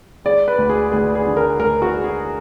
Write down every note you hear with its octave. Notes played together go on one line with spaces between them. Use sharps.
G#3 D5
B4
D2
G#4
D2 G#4
G#4
D3
A#4
D2 A#4
F#4
G#3
G#4